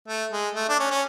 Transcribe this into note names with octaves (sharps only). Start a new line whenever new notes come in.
A3
G#3
A3
D4
C#4
C#4